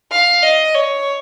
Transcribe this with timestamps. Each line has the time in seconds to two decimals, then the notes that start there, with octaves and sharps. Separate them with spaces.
0.11 F5
0.43 D#5
0.75 C#5